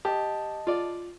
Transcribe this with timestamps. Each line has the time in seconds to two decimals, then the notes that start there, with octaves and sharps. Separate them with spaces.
0.05 G4 D#5 A5
0.67 F4 D5